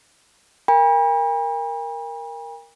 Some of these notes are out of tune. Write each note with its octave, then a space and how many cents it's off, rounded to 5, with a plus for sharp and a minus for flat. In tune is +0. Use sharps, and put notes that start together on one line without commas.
A#4 +0 G5 +45 B5 -45